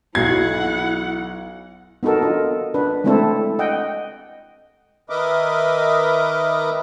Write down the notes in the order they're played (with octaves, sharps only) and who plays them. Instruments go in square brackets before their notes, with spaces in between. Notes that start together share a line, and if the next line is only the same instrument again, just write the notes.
[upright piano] B1 F#3 C7 [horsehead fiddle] E4 F#5 [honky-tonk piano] G#6
[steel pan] B3 D#4 F#4 A4 A#4
D4 F4 D#5
D4 B4
G#3 A3 C4 D4 E4 A4
D#5 F#5 G5
[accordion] D#3 A#4 B4 D#5 E5 D6